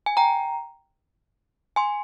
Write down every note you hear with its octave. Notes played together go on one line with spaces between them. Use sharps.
G#5
G5 A#5
G#5 C6